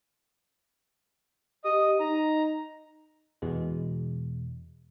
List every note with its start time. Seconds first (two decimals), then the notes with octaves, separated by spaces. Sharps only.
1.65 G4 D#5 D#6
2.00 D#4 A#5
3.42 E2 B2 G#3